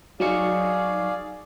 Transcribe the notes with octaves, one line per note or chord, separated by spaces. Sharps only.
F#3 D#4 G#4 D5 F5 C#6